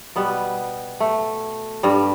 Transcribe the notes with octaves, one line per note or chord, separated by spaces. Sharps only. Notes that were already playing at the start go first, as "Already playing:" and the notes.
B2 G3 B3
A3
G2 G3